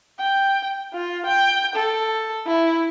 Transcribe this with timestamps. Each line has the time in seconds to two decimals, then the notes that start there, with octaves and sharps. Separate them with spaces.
0.19 G5
0.94 F4
1.26 G5
1.75 A4
2.46 E4